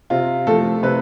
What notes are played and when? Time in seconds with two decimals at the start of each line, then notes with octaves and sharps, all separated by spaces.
0.10 C3 F4
0.47 F3 A3 A4
0.83 C3 B4